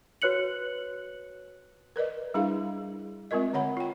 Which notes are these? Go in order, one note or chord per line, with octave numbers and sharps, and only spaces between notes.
F#4 B4 C#5 F#6 C#7 F#7
A#4 B4 D5 D#5
G3 D4 E4 G#4 F5
G#3 C4 F4 A#4 D#5
D3 C#5 F#5 B5
F4 G5